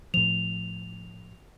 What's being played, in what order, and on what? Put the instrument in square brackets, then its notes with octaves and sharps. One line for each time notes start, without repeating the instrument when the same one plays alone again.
[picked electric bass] A2 F3 [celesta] F7